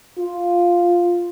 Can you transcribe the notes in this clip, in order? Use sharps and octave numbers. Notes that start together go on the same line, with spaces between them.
F4